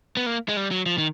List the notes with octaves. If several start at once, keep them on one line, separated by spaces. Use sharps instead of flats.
B3
A#3
G#3
G3
F#3
F3
D#3